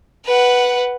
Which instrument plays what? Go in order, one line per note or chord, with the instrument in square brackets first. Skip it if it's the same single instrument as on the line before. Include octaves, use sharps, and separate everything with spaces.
[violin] B4 F#5